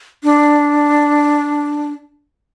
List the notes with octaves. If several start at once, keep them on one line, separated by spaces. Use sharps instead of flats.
D4